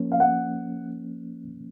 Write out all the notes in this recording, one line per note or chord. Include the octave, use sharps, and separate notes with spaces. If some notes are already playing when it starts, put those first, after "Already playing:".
Already playing: F3 A#3 C#4
F5
F#5